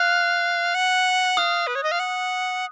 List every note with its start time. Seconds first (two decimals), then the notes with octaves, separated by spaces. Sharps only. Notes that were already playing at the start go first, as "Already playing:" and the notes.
Already playing: F5 F#6
0.75 F#5
1.37 F5 D#6
1.67 B4
1.75 C#5
1.83 D#5
1.92 F5
2.00 F#5